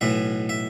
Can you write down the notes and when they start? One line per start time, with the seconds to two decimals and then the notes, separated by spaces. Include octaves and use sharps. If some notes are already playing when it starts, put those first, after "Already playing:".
0.01 B1 A2 E3 E5
0.49 E5